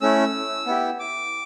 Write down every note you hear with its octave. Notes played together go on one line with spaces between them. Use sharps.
A3 C#4 E4 E6
B3 E4 G4
D6